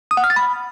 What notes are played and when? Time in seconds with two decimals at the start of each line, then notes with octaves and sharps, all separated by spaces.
0.11 D#6
0.17 F#5
0.24 F6
0.30 A6
0.36 B5